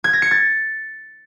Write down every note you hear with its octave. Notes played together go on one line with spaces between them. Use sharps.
G#6
A#6
C#7
A6